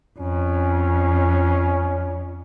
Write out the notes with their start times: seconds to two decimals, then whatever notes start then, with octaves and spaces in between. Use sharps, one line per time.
0.19 F2 C#4